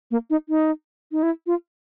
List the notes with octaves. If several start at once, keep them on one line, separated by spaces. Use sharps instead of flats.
A#3
D#4
D#4
D#4
E4
F4